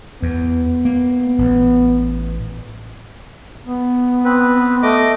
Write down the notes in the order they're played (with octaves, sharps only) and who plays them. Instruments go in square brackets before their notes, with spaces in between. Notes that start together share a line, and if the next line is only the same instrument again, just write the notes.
[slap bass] E2 [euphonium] B3
[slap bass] A#3
A1
[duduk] B3
[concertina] C4 B4
A3 D#5 D6